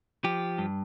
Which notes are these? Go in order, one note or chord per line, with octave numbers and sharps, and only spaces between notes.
F3 G4
G2